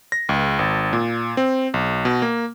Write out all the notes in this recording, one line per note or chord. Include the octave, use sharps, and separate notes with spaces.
A#6
C#2
G#1
A#2
C4
B1
B2
A#3